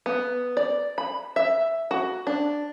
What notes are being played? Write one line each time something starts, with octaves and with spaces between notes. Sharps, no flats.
B3
D5
B5
E5
F#4
D4